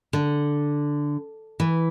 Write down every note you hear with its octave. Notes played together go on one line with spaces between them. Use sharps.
D3
E3